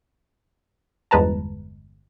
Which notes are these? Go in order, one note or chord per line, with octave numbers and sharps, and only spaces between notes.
G1 E2 G#3 B4 A5 A#5